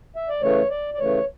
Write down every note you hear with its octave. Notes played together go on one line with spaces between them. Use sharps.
E5
D5
C#3 E3 A3 C#5
D5
D5
C#3 E3 A3 C#5